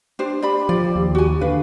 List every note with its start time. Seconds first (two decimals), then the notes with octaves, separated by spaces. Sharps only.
0.19 D4 G4 C5
0.42 G4 D5 B5
0.69 F3 D5
0.96 D#2
1.15 F#4 G#5
1.41 D3 B4 F5